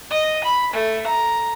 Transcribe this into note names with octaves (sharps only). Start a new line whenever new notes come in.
D#5
B5
A3
A#5